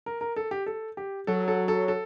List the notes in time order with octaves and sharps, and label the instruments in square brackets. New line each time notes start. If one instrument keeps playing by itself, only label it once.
[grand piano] A#4
A#4
A4
G4
A4
G4
[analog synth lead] F#3 [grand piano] A4
[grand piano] A4
A4
A4